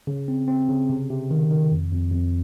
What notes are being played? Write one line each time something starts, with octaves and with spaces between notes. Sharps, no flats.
C#3
C4
C4
C#3
C3
C3
D#3
D#3
F2
F2
F2